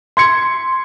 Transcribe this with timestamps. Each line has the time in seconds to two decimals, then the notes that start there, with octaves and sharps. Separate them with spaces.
0.17 C6 G#6 C#7